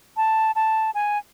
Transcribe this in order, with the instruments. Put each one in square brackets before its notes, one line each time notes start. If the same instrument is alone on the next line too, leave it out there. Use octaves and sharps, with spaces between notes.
[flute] A5
A5
G#5